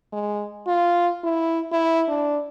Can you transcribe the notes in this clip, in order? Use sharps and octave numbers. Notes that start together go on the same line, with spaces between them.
G#3
F4
E4
E4
D4